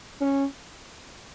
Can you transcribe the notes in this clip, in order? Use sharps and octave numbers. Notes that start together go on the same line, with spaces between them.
C#4